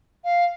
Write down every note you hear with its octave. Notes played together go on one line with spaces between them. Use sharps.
F5